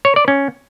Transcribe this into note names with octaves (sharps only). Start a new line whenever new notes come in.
C#5
D5
C#4